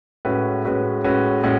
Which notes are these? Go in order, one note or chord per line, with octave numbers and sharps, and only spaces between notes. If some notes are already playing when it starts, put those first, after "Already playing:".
A2 G#3 C#4 F#4 B4
A2 G#3 C#4 F#4 B4
A2 G#3 C#4 F#4 B4
A2 G#3 C#4 F#4